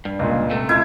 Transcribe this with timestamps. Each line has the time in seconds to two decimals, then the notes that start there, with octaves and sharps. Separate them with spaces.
0.05 G2
0.19 C#2 A#2
0.50 C3 A3
0.69 C#2 E4 G#6